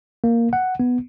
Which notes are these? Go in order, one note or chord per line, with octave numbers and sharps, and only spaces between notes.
A#3
F#5
B3